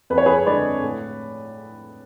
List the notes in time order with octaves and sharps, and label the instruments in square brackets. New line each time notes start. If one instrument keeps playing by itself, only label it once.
[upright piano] F2 B4
C#5
G#4 B4
D3 G#3 B4 D5
A2